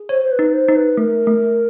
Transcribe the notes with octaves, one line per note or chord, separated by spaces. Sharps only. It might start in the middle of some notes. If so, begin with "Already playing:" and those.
Already playing: G#4
C5 C#5
C5
B4
D#4
C5
D#4
B4
A3 A#4
A3